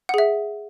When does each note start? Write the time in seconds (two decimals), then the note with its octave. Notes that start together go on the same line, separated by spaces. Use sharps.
0.09 F#5
0.14 G#4
0.18 E5